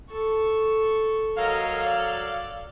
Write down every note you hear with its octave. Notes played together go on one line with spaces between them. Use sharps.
A4 C#6
F#3 A4 A#4 D#5 F5
D5